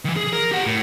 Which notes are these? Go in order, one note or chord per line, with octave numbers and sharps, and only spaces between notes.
D#3 E3
G#4
A#4
G4 F#5
A2